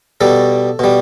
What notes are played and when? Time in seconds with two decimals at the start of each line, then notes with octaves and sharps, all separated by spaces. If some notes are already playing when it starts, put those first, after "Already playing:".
0.21 B2 G3 A4
0.79 B2 G3